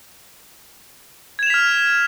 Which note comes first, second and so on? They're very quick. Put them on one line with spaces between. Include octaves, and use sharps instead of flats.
G#6 E7 F7 B6 F6